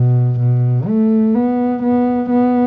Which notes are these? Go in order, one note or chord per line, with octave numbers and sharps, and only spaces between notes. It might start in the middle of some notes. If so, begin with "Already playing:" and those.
Already playing: B2
B2
A3
B3
B3
B3